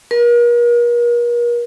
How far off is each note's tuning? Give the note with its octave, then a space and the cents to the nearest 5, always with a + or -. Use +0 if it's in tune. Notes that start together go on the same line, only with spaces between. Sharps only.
A#4 +40